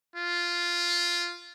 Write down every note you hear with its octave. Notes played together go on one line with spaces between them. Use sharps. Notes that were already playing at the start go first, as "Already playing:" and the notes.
F4